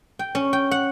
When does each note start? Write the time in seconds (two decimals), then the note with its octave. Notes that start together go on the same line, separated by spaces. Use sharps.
0.19 G5
0.35 C#4
0.53 G5
0.71 F#5